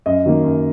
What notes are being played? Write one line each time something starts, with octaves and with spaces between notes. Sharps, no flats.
F#2 D#5
D#3 F#3 A#3
F#2